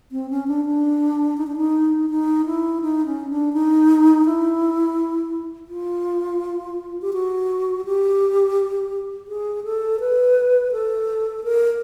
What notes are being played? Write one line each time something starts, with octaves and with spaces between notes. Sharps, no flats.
C4
C#4
D4
D4
D#4
D4
D#4
D#4
E4
D#4
C#4
D4
D#4
E4
F4
G4
F#4
G4
G#4
A4
B4
A4
A#4